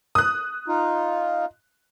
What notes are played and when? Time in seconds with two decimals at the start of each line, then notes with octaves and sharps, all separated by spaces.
0.15 D#6 F#6
0.68 D#4 F4